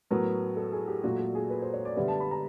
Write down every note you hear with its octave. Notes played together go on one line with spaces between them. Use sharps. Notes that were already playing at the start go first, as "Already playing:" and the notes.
A2 F#3 B3 A#4
A4
G#4
G4
A#2 F#3 A3 F#4
A4
G#4
B4
C5
C#5
D5
D3 G3 B3 E5
A5
B5
A#5